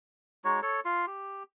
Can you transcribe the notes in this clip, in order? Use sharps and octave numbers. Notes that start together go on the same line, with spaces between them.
G#3 D#4 F#4 C#5
A4 C#5
F4 C6
G4